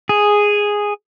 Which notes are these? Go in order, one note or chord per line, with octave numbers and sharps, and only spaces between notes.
G#4